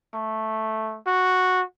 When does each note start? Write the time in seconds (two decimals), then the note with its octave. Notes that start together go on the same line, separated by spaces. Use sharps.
0.14 A3
1.06 F#4